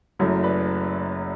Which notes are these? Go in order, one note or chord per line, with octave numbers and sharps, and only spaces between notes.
F#1 F#2 F#3 A3 E4
B4 D5